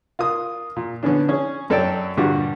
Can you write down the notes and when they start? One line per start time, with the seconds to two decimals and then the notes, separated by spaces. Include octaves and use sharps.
0.19 F4 A#4 D#6
0.76 A#2
1.03 D3 B3 C#4 D4
1.28 C#4 G#4
1.70 F#2 A4 C#5 D5 G5
2.17 G2 A#2 D3 D4 F#4 G4